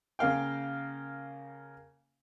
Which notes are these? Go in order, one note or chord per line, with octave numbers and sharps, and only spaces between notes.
C#3 A#3 F5 G5